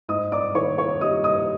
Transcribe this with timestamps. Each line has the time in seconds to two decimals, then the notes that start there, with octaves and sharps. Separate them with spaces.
0.09 G#2 D#5 D#6
0.32 D5 D6
0.55 D#3 C#5 C#6
0.78 C#5 C#6
1.01 G3 D#5 D#6
1.24 D#5 D#6